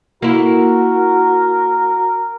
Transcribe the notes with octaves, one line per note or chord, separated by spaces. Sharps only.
A#3 E4 F#4 A#4